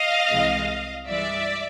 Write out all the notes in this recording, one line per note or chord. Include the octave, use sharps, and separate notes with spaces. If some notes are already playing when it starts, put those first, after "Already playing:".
Already playing: D#5 F5
C2 C3 E3 G#3
G2 E3 G#3 D5 E5